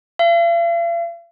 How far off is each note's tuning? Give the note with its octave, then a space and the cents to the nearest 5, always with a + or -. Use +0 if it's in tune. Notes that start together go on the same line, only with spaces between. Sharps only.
F5 -45